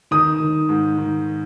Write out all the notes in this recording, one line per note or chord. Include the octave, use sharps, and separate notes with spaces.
D#3 D#6
D#3
G#2
D#3